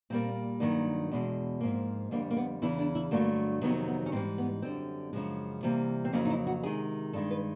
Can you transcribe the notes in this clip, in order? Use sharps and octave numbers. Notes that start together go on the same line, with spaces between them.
A#2 G3 A#3 C4
G2 D#3 F#3 A#3
E2 B2 G#3
G#2 F3 A#3
F2 D3 G3 A#3
A#3
B3
E2 C#3 E3 E4
D4
E4
G2 D3 F#3 A3 A#3
F2 C3 D#3 F#3 B3
B3
C#4
G#2 E3 G3 C4
B3
F#2 D3 G3 C4
F#2 C#3 F3 G#3
C3 E3 G3 A#3
C4
F2 C#3 F#3 A#3 C#4
D#4
E4
F#4
C3 D#3 G#3 G#4
G2 D#3 G#3 A4
B4